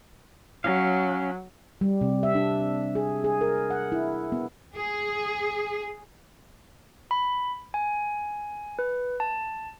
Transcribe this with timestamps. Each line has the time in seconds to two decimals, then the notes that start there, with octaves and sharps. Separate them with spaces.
0.64 F#3 C#4 F5
1.81 G3
2.01 C3
2.23 E5
2.35 D4
2.95 G#4
3.24 G#4
3.41 A#4
3.70 F#5
3.92 E4
4.32 B3
4.76 G#4
7.11 B5
7.74 G#5
8.79 B4
9.20 A5